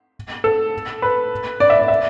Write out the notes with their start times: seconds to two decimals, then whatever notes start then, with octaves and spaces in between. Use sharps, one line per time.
0.44 A4
1.02 B4
1.60 D5
1.70 E5
1.79 D5
1.88 E5